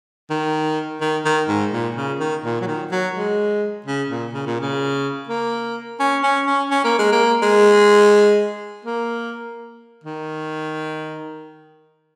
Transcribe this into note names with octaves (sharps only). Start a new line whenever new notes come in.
D#3
D#3
D#3
G#2
A#2
C#3
D#3
A#2
F#3
D#3
F#3
G#3
C#3
A#2
C#3
A#2
C#3
A#3
C#4
C#4
C#4
C#4
A#3
G#3
A#3
G#3
A#3
D#3